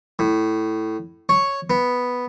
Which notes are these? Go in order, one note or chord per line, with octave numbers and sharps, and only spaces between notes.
A2
C#5
B3